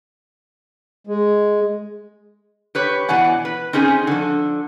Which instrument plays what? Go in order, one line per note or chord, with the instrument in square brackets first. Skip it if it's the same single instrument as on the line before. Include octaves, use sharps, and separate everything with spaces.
[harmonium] G#3
[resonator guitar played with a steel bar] G4 B4 C#5
B2 E3 D5 F#5 G#5
B4
C4 C#4 D#4 G#4 G#5
D3 F3